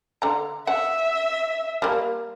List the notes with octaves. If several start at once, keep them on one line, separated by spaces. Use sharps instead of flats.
D3 A#5
E5 F#5
G3 A#3